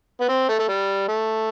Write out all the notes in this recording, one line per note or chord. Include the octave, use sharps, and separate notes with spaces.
B3
C4
A3
A3
G3
A3